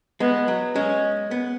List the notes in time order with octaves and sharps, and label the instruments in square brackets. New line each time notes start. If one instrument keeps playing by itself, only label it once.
[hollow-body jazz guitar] G#3 [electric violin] B3
[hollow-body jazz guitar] F#3
[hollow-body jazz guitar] G#3 [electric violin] C#4
[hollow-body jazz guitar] B3